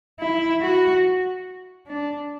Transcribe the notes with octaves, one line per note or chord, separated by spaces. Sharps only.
E4
F#4
D4